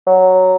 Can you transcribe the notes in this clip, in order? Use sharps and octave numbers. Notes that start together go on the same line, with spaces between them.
F#3